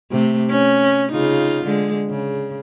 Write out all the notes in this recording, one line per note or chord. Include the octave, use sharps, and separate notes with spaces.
C3 A3
C#4
C#3 D#4 F4
D3 G#3
C#3